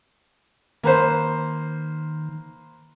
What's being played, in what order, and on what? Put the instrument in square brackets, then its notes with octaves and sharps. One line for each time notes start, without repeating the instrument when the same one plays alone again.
[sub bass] D#3 [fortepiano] A#3 B4 C5